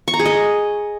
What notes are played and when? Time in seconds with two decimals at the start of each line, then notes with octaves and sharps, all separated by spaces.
0.08 C#6
0.14 A#5
0.20 G#4
0.25 D#5